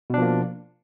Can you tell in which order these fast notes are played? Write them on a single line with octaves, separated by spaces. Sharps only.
B2 D4 F3 A#3